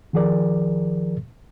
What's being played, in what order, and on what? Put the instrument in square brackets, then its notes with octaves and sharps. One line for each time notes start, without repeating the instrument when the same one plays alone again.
[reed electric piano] D#3 F3 G#4 A#4 D5